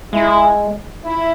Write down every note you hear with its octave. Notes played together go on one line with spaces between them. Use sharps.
G#3 E4
E4